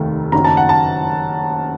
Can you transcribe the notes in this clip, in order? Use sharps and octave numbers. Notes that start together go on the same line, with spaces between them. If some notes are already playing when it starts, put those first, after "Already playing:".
Already playing: F1 D#2 D#3 A3
F#1 F#2 D#3 A#5
A5
F#5
A5